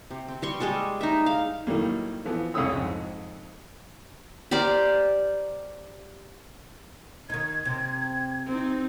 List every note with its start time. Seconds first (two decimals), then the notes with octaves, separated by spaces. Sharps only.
0.11 C3
0.28 C4
0.42 G3 C6 C#6
0.60 G3 G#3 G#4 A4
1.01 D#4 E5
1.26 F5
1.67 A2 D#3 F#3 G3 A#3
2.25 E3 F3 B3
2.54 C2 C#3 C#4 D#6 E6
2.72 F2 G#2
4.51 G4 A#4 C5 D5
7.30 D#3 D#4 G#6
7.65 C3
8.47 C4 D#4